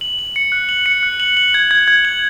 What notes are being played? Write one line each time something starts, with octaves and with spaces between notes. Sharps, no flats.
F#7
F#7
C#7
F#6
F#7
C#7
F#6
F#7
F#7
G#6
G#6
G#6
F#7